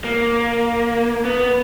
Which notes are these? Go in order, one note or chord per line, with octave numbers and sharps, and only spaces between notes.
A#3
B3